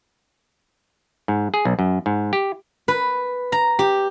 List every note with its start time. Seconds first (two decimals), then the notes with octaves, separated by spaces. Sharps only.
1.28 G#2
1.54 G#4
1.65 B1
1.79 F#2
2.06 G#2
2.33 G4
2.88 B4
3.52 A#5
3.79 G4